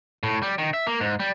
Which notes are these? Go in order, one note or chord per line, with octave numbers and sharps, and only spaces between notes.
A2
G3
D#3
E5
A#3
G#2
G3